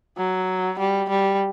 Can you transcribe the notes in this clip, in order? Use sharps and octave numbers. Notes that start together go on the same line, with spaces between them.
F#3
G3
G3